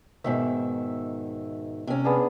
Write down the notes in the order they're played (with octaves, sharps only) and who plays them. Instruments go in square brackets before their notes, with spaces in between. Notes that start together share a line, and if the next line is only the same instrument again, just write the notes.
[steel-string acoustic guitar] G#2 B2 D#3 [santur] E5
[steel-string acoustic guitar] C3 C#4
[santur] B3 D4 G#4